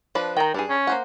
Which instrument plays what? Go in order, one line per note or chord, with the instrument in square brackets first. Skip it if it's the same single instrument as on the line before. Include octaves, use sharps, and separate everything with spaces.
[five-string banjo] F3 D4 B4
[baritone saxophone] D#3 [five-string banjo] G5 A#5
[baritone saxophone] G2 [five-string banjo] D4 G#4
[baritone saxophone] C#4
[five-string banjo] A#3 C5 F#5